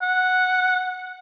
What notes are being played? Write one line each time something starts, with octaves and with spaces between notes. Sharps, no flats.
F#5